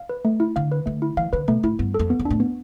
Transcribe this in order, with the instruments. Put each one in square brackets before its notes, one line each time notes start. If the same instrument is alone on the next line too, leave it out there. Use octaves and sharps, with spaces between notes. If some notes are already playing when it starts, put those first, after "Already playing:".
Already playing: [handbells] F5
B4
A3
E4
[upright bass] D3 [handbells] F5
[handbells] B4
[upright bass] D3 [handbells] A3
[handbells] E4
[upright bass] E3 [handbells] F5
[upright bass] D3 [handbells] B4
[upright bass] B2 [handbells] A3
[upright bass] A2 [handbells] E4
[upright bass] G2 [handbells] B3
[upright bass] F2 [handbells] A4
[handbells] B3
[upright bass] E2
[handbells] D4
[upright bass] A2
[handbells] B3